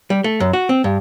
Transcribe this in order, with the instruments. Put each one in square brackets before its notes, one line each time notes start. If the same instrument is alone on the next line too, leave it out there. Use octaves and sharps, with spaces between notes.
[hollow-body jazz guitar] G3
A3
F#2
F#4
C4
G2